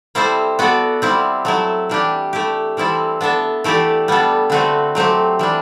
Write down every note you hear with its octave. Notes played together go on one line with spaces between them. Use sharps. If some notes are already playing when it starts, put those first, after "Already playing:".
G3 C4 E4 A4 C5
B3 F#4 A4 D5
G3 C4 E4 G4
F#3 A3 E4 A4
E3 G3 D4 G4
A3 E4 G4
E3 G3 C4 E4 A4
B3 D4 A4 E5
E3 A3 E4 G4 D5
G3 B3 D4 A4
D3 A3 C4 F#4 B4
F#3 A3 C4 G4
E3 G3 D4